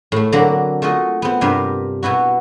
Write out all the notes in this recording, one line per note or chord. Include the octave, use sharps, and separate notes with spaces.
A2 A3
D3 F#3 A#3 C4 A#5 B5
A3 F4 F#4 D#5
B3 C4
G2 C3 G4 A#4 B4 F5
B2 B3 E4 F#4